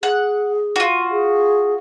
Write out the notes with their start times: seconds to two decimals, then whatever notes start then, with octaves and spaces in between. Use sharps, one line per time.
0.03 G#4 F#5
0.76 F4 F#4
1.11 G#4